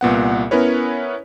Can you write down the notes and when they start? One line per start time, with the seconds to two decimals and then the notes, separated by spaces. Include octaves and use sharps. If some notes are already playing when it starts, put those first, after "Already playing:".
0.01 C2 A#2 B3 F#5
0.51 B3 C#4 E4 A#4 B4 C#5